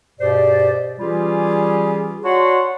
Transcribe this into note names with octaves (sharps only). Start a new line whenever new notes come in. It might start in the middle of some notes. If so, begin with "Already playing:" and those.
G2 B2 G4 G#4 C5 D5
E3 G3 C#4 F4 G4 G#4
F#4 C#5 D5 F#5 A5 C6